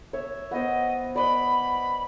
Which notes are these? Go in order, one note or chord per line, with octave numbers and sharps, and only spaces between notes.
C#5 E5
B3 C5 D#5
D5 D#5 F#5 B5